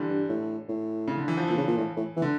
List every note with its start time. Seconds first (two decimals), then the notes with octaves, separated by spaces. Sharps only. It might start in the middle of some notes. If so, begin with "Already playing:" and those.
Already playing: D3 E3 G3
0.08 G2
0.29 A2
0.69 A2
1.08 C#3
1.17 D3
1.28 E3
1.37 F3
1.48 A#2 E3
1.58 C#3
1.68 A#2
1.78 A2
1.97 A2
2.17 E3
2.22 D3